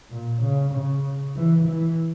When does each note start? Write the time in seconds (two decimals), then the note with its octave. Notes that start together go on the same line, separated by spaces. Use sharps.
0.11 A#2
0.42 C#3
0.74 C#3
1.37 E3
1.68 E3